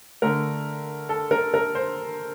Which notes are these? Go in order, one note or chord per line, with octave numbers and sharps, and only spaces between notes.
D3 A3 A#4
A4
A#4
A#4
C5